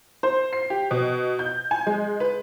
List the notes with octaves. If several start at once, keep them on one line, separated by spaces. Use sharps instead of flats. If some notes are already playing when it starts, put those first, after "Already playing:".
C5
C7
G4
B2
G6
G#5
G#3
B4